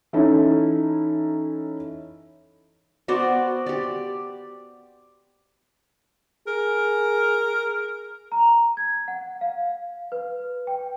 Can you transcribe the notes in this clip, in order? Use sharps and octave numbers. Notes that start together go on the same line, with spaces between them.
E3 C#4 D#4 E4 A4
B3 F#4 C5 D5
G4 D5
G#4 A#4
A#5
G#6
F#5
F5
B4
G5